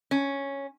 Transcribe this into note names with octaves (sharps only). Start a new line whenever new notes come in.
C#4